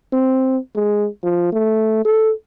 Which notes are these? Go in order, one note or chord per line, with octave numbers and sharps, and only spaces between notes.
C4
G#3
F3
A3
A4